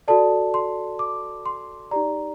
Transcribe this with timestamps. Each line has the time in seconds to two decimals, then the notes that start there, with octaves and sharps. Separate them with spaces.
0.08 F#4 A4 D5 A5
0.54 C6
0.99 D6
1.46 C6
1.91 D#4 G4 D5 A#5